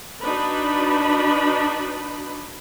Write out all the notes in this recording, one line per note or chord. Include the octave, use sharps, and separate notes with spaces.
D4 D#4 F#4 B4 B5